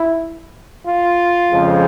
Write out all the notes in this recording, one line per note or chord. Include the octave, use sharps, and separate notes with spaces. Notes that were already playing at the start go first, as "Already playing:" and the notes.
Already playing: E4
F4
F2 C#3 F3 G#3